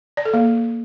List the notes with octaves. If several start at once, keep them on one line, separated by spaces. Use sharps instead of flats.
D5
A4
A#3